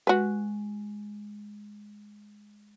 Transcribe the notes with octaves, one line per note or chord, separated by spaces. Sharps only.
G#3 F#4 B4